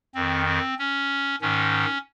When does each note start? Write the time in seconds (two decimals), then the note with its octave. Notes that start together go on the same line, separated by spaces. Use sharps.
0.15 F2 D#3 C4
0.46 C4
0.79 C#4
1.41 G#2 D#3 C#4